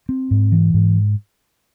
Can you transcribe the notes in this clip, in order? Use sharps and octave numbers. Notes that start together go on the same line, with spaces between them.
C4
G#2
E3
G#2